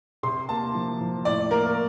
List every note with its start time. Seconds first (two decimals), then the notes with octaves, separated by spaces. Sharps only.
0.23 C3 C6
0.49 A#3 A5
0.74 F3
1.01 F3
1.25 A2 D5
1.51 A#3 A#4